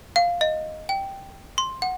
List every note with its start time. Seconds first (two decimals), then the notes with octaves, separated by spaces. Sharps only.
0.16 F5
0.41 D#5
0.89 G5
1.58 C6
1.82 F#5